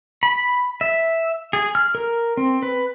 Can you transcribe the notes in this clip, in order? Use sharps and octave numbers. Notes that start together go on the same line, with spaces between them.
B5
E5
G#4
F6
A#4
C4
B4